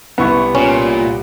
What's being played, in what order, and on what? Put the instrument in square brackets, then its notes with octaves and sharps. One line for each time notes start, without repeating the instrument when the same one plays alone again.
[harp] C2 C#6 [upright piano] B3 E4
[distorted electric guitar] A#2 [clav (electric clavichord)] C#4